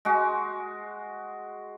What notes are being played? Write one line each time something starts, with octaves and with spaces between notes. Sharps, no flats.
G#3 F#4